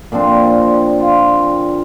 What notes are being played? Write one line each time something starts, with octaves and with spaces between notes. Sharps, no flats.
A#2 F3 C4 D4
F4